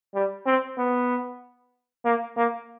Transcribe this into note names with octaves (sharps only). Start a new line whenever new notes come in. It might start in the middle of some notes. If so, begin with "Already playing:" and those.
G3
C4
B3
A#3
A#3